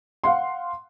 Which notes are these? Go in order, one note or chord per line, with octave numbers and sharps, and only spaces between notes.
F5 F#5 C6